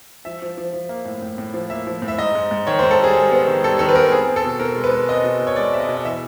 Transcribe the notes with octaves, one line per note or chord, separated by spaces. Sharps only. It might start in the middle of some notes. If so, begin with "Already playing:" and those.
F3 E5
F3
F3
F3
A#3
A2
A2
A2
F3
A#3 E5
F3
A2
E5
G#2 D#5
G#2
G#2
D#3 C#5
C5
G#2
A4
G3 G#4
G3
B3
D#3
G3 A4
D#3 A4
B4
B3 A#4
C4 G#4
C4
A4
B2
B2 A#4
G#3
B4
G#3
C4 D#5
B2
B2
C#5
G#3 D5
C4 E5
D#5
B2
D#5
E3 E5